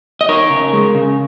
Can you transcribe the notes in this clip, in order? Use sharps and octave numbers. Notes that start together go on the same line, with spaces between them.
D#5
D#4 A#4 C#5
C#3
G#3
C#3